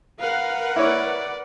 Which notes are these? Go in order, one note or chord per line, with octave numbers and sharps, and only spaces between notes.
A#4 B4 F5 F#5
E4 C#5 D5